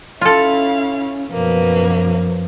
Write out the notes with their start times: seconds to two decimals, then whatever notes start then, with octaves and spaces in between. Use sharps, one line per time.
0.21 C#4 E4 F4 A4 F5
1.30 F#2 B2 F3 A#3 B4